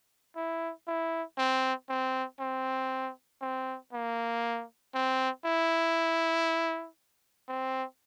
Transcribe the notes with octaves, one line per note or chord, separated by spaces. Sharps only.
E4
E4
C4
C4
C4
C4
A#3
C4
E4
C4